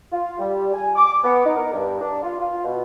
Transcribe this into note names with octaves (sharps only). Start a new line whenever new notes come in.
F4
G3
G#5
D6
B3
D#4
A#4
G2
D4
F4
F4
B2